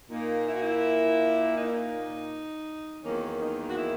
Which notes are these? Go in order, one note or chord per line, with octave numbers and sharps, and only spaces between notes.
A#2 A#3 D#4
E4
F#4
E4
D#4
E4
D#4
E2 D#3 F#3 A#3 C#4
D#4
F#4
E4